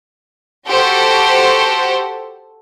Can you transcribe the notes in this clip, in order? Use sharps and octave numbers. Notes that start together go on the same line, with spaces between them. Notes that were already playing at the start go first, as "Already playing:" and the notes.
F#4 G4 A4 C5